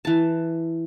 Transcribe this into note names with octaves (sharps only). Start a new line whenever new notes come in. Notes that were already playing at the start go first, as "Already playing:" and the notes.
E3 A5